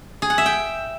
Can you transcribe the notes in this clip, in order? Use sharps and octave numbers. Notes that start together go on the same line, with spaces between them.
G#4
F#5
E5
G5